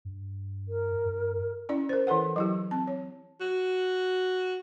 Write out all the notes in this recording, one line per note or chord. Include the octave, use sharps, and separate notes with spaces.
G2
A#4
G2
C#4 E4 D5
A#4 C5
E3 E4 A4 B4 F#5
F#3 E4 G4
C4 A5
C#5
F#4